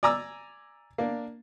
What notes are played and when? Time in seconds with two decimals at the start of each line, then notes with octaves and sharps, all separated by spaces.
0.03 D5 G#5 A#5 D6 E6
0.98 A#3 D4